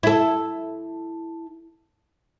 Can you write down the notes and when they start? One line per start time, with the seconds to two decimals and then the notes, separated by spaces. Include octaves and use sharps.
0.03 E4 A4